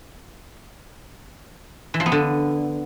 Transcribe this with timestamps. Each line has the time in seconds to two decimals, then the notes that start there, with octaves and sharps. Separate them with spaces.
1.94 E3
2.00 F3
2.06 B3
2.12 D3